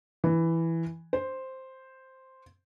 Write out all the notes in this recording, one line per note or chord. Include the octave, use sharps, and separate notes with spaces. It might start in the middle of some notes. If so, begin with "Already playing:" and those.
E3
C5